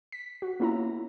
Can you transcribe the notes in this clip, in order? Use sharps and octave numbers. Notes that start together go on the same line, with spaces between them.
B6
F#4
A#3 B3 C#4 E4 F4 A#5